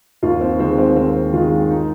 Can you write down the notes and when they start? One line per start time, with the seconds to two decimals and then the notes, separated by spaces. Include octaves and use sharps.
0.22 D#2 F4
0.41 C4
0.59 D#3 G#3 C4
0.78 C4
0.96 D#2 C4
1.33 D#3 G#3 F4
1.70 D#4